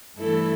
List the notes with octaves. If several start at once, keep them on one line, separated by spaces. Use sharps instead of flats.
G2 E3 A3 E4 A4